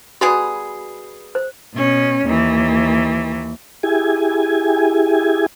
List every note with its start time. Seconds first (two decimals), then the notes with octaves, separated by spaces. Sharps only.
0.21 G3 B3 F#4 G#4
1.35 C5
1.75 B2 C#4
2.25 D#2 E3
3.83 E4 G4 G#4 G#5